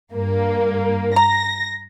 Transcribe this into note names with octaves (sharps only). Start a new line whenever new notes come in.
G2 A#3
A#5 A#6